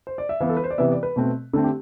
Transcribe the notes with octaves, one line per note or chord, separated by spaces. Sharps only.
C5
D5
E5
E3 B3 F5
A4
B4
C5
D5
C3 E3 B3 E5
D5
B4
B2 A3 C4
D3 A3 C4 A4
G4